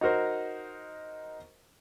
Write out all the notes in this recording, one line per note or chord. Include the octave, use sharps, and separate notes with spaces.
D#4 F#4 A#4 C5